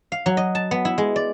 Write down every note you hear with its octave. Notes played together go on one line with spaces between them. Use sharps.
F5
F#3
D#5
A5
B3
E4
G#3
D5